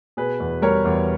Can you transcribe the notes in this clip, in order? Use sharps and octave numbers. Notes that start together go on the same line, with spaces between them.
B2 G#4 B4
E2
G3 A#4 C#5
E2